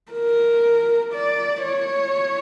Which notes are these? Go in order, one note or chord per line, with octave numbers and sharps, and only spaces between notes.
A#4
D5
C#5